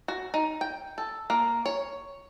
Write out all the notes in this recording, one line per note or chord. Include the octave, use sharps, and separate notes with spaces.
F#4
D#4
G5
A4
A#3
C#5